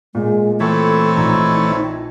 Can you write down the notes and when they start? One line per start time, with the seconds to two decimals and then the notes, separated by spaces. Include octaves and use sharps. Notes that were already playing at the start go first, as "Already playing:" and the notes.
0.15 A#2 G#3
0.60 E3 A3 C4 E4 A4 C#5
1.17 A#1 D#4 A#5